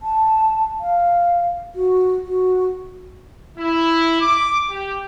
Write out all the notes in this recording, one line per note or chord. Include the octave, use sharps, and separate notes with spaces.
A5
F5
F#4
F#4
E4
D6
G4